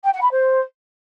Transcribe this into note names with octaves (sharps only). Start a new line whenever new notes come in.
G5
F#5
B5
C5